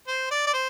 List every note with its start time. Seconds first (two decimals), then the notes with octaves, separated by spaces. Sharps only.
0.08 C5
0.31 D5
0.47 D5
0.53 C5